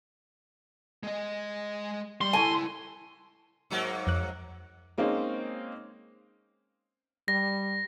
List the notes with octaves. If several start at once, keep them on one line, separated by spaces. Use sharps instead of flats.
G#3 D#5
G3 C6
C#2 E4 A4 G#5
G#2 F#3 A#3
F2 F#6
G#3 A#3 C4 C#4 D#4
G3 A#6